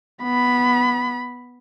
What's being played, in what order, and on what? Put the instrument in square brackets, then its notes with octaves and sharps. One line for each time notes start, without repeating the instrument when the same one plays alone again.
[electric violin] B3 B5